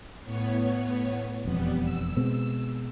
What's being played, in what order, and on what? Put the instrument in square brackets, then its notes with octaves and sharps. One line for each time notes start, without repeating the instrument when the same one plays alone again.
[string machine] A2 B3 C#5
[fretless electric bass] E1 F2 [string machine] G3 B3
[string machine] E6
[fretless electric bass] B2 G#3 C4